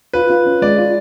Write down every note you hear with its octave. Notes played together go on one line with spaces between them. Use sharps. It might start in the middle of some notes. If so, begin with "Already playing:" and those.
F4 B4
F4
C#4
G#3 D5
F4